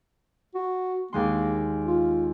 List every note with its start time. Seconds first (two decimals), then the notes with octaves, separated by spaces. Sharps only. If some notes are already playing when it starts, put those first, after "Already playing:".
0.55 F#4
1.13 D#2 G#3 A#3 C6
1.86 F4